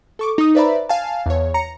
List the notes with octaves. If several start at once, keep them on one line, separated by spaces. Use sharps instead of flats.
A4 C#6 D6
D#4 D#6
B4 C5 D5 E5 A#5 B5
F5 G#5 A5
E2 C#5
A#5 C#7